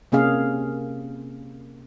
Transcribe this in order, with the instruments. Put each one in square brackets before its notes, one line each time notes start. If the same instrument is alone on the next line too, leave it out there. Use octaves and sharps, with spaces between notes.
[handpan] C3 A#3 C#4 G#4 F5